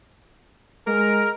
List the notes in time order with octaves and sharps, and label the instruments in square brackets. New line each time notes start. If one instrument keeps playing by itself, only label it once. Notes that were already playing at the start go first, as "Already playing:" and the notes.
[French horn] G#3 [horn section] A#4